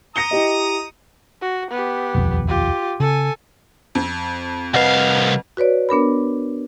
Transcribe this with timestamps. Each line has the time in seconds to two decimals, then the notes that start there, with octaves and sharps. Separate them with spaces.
0.16 A#5 D#6 A#6 C#7 G7
0.31 E4 G4 D#5
1.41 F#4
1.71 B3 G4
2.14 D#1 B1 F2
2.48 F4 G4
3.00 C#3 A4 G#5
3.95 F2
4.74 C2 B4 D#5 F5 F#5
5.57 F#4 B4 C#5 D5
5.89 B3 D4 A#4 B5